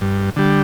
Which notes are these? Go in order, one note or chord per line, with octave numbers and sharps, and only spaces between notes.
G2
D3 G3